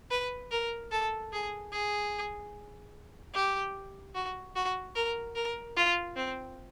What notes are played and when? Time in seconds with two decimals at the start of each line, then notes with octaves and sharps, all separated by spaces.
0.11 B4
0.52 A#4
0.92 A4
1.33 G#4
1.72 G#4
3.34 G4
4.15 F#4
4.56 F#4
4.96 A#4
5.36 A#4
5.77 F4
6.16 C4